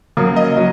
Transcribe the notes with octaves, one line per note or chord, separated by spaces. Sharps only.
C#3 F#3 A#3
D#5
F#3